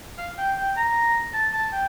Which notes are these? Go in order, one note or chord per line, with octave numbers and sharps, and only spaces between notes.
F5
G5
G5
A#5
A5
A5
G5